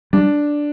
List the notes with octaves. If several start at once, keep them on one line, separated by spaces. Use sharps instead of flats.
G3 D4